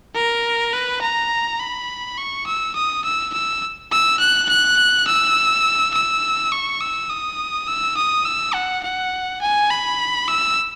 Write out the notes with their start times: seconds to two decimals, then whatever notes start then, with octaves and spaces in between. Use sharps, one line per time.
0.15 A#4
0.73 B4
1.02 A#5
1.60 B5
2.18 C#6
2.47 E6
2.76 D#6
3.04 E6
3.33 E6
3.92 E6
4.20 F#6
4.49 F#6
5.07 E6
5.94 E6
6.52 C#6
6.81 E6
7.10 D#6
7.68 E6
7.97 D#6
8.25 E6
8.54 F#5
8.83 F#5
9.41 G#5
9.70 B5
10.28 E6